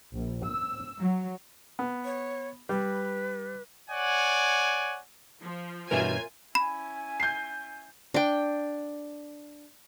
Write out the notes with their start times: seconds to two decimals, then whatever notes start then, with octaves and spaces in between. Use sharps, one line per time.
0.16 A#1
0.47 E6
1.01 F#3
1.79 B3
2.05 C#5
2.69 G3 B4
3.90 C#5 D5 F#5 G#5
5.41 F3
5.91 G2 B2 E3 F4 A#4 C#5 E5 G#5
6.55 C#4 E4 G#5 B5
7.20 G6 C7
8.14 D4 G5